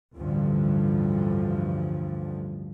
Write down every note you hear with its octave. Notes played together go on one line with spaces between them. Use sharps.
A1 D2 G2 D3 F3